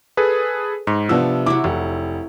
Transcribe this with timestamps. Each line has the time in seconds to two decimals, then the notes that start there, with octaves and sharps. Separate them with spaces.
0.17 G#4 A4 B4
0.87 G#2 C#5
1.09 C3 F3 B3 D4 E6
1.46 F#3 E4 D6
1.64 F1